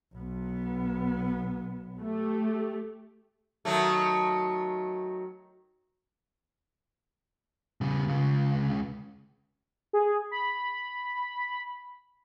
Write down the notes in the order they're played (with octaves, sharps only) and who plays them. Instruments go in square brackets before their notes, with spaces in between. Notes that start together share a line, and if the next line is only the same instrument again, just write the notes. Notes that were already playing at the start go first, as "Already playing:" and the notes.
[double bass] B1 B3
[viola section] A3 G4
[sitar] D#3 F#3 A3
[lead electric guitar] C#3 G3
C#2 C#3
[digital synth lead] G#4
B5